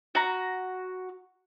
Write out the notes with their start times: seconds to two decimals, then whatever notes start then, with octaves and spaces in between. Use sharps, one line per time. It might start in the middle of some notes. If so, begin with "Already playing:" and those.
0.15 F#4 A#5